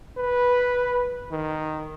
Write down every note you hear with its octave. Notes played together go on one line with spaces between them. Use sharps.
B4
D#3